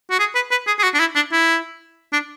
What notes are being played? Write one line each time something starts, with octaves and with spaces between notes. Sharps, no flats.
F#4
G#4
B4
B4
G#4
G#4
F#4
D4
E4
D4
E4
D4